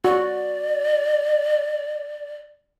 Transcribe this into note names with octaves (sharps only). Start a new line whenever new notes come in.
F#4 D5